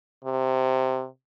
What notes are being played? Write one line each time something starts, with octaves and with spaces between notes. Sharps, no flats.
C3